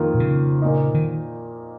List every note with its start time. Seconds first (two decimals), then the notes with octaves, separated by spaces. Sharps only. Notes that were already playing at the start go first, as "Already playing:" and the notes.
Already playing: F2 D#3 A#3 F4
0.14 A#2
0.20 C#3
0.62 A#2 A#3 D#4
0.94 D#3